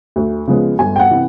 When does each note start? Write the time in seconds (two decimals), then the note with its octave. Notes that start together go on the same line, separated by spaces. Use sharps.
0.16 D2
0.47 C#3 F3 G#3 B3
0.79 G1 G#5
0.96 G5
0.99 F#5
1.11 C3 E3